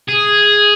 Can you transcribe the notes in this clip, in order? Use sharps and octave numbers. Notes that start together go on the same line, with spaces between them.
G#4